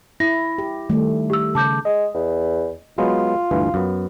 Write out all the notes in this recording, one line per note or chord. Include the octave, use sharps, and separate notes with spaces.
E4 A#6
G4
D#3 G3 A3
G4 E6
C#3 A5 D6 G6
G#3 D#5
E2
F#3 G#3 B3 F4
D2 G2 E3
F#2 B3